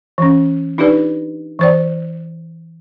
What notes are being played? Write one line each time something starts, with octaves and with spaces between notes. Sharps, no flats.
E3 C#4
D4 D#4 F4 G4 B4 D5
E3 C5 D5